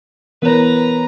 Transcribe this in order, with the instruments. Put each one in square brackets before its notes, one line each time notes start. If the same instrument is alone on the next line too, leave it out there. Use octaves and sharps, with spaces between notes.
[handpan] E3 B3 [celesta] A#4 C#5 [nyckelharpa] B4 A#5